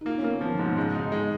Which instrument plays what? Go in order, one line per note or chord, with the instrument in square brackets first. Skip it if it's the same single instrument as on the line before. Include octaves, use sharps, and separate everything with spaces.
[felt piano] D#4
[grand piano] A#3 [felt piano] F4
[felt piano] C#4
[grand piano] A#3
[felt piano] B3
[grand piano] F3 [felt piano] B3
[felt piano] D#3
[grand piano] G#2
[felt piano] B2
[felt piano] C#3 [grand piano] G#3
[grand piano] D#4
[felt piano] D#3 [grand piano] G#3